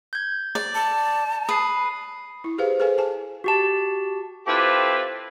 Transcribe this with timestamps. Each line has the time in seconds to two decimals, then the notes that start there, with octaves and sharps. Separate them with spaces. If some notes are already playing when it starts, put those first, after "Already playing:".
0.13 G6 G#6
0.55 D5
0.75 A5
1.49 B4 D#6 C7
2.44 E4
2.58 G4 G#4 B4 C5 F5
2.80 G#4 A4 B4 C5 F5 G#5
2.98 G#5 A5
3.44 F#4 G4 A5
4.47 C4 E4 F4 G4 A4 B4